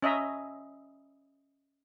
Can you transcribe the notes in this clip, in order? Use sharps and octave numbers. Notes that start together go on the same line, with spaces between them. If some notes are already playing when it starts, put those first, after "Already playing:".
C#4 D#5 E5 A#5